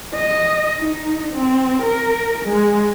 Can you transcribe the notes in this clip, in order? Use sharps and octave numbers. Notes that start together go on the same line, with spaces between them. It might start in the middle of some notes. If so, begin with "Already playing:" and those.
D#5
D#4
C4
A#4
G#3